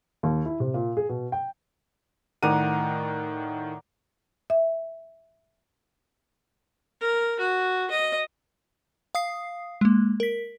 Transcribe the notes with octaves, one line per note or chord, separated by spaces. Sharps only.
D#2
E4
C3
A#2
G#4
B2
G5
A2 D#3 A#4 D5 F#5 D#7
E5
A#4
F#4
D#5
F5 D#6 C7
G#3 A#3
A#4 B6